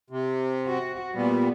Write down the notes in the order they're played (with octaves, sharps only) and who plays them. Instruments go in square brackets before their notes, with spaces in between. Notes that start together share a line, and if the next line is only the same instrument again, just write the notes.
[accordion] C3
[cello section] F#4
[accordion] A#2 G3 [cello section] B3